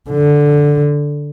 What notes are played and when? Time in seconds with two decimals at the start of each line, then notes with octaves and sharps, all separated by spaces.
0.10 D3